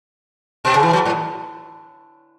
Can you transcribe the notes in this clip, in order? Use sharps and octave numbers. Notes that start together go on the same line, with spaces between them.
B2
C#3
E3
F#3
A2